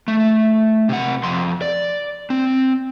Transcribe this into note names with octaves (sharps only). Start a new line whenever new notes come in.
A3
C3 F#5
F2 C6
D5
C4